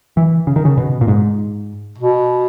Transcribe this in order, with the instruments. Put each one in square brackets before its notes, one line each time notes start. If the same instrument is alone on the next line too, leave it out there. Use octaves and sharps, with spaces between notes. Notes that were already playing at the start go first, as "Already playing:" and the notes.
[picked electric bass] E3
C#3
D#3
C#3
B2
A#2
G#2
[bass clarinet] B2